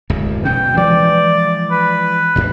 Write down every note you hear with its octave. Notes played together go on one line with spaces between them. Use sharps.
D1 C#2 F#2
D2 B2 C#4 G5
E3 F3 G#3 D5
B4
A1 F#2 B2